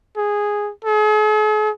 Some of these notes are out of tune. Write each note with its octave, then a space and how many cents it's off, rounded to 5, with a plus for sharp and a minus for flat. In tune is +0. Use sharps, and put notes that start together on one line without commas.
G#4 -5
G#4 +45